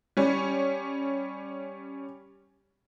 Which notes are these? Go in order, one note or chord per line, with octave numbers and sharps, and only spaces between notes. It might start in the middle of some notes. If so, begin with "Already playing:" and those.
G3 C#4